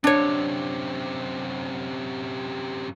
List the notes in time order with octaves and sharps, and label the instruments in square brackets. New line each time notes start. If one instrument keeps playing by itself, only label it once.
[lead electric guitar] F#2 C3 [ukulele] D4 C#5